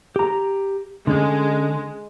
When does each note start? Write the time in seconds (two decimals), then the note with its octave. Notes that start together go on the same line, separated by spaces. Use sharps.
0.16 G4 A#5
1.07 D3 G#3 C#4